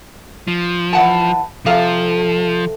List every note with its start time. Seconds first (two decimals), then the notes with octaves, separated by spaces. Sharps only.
0.48 F3
0.93 E3 F#5 A5
1.66 C3 F3 A4 F5